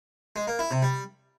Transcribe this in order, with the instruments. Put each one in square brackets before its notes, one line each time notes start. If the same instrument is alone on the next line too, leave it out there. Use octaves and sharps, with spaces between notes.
[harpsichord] G#3
A#3
E4
C3
G3